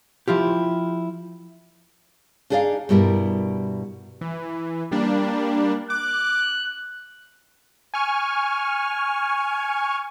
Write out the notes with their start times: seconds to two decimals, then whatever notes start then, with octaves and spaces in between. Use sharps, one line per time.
0.28 F3 E4 F4 G4
2.50 D4 D#4 G#4 D5 D#5 F5
2.89 G2 B2 G3 E4 A#4
4.21 E3
4.91 G3 A#3 D4
5.90 D6 F#6
7.94 G#5 C#6 F6